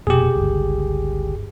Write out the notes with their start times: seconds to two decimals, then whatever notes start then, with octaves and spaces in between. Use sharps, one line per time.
0.07 F1 B2 A#3 G4 G#4
0.35 G1 C#2